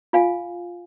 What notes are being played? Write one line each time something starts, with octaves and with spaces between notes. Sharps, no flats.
F4 F5 G#5